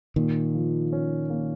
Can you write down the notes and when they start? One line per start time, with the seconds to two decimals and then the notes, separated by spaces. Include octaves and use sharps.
0.16 A#2 D#3
0.55 F3
0.93 C#4
1.30 A#3